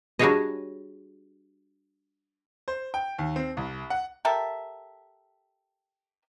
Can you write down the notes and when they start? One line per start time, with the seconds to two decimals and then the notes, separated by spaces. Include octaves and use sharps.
0.19 G3 D4 F#4 G#4 C#5 D#5
2.68 C5
2.94 G5
3.19 D#2
3.36 C4
3.57 C2
3.90 F#5
4.25 G4 A4 A#4 E5